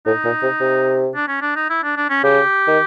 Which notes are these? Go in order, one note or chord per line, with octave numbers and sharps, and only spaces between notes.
A2 D#4
A#2
C3
C3
D4
C#4
D4
D#4
E4
D4
D4
C#4
C#3 G4
D#3